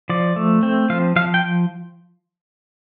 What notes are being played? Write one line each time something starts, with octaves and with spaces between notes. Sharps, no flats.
F3 D5
A3
C4
F3 F5
F3 F5
G5